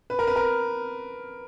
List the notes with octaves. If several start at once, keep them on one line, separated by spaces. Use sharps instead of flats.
B4
A#4
B4
A#4